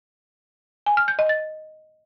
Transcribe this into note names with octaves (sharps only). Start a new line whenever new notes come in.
G#5
F6
G6
D#5
A6